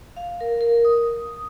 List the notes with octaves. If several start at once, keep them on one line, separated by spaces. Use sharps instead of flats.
F5
A#4
A#4
D#6